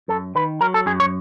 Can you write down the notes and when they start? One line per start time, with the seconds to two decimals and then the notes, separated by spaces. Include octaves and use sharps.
0.08 F#2 A4
0.35 D#3 B4
0.61 F#3 A#4
0.74 A4
0.86 F#2 G#4
1.00 C#5